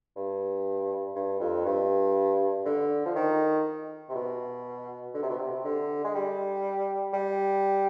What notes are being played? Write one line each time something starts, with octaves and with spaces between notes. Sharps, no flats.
G2
G2
F2
G2
D3
F3
D#3
C3
B2
D3
C3
B2
C3
D3
G#3
G3
G3